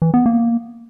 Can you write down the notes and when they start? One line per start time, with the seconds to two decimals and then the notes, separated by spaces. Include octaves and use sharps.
0.02 E3
0.14 B3
0.26 A#3